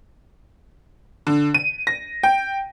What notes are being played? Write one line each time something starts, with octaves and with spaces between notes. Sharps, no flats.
D3
D#7
A#6
G5